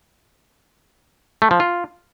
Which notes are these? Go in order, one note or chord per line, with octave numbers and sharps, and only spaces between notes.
A3
F3
F4